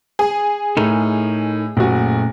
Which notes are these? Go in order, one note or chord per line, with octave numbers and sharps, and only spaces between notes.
G#4
A2 D#4 A4 A#4
F#1 A#2 A3 C#4 F#4